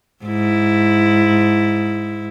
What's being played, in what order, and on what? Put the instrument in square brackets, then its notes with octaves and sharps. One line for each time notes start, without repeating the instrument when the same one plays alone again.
[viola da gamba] G#2 E4